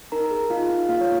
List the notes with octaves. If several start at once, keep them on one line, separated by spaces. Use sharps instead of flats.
D#4 A#4 A#5
G#4
D#4 F4 F5
D#4
A#3 F4 F5
C#5